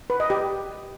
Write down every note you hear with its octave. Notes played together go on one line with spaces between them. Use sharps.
B4
D#5
G4